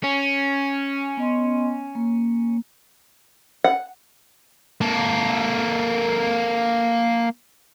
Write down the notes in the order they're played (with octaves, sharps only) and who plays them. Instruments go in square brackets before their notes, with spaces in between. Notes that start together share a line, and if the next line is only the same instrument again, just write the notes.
[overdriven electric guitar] C#4
[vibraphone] B3 D#5 C6
A#3
[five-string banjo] F#5
[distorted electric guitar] A#3 A4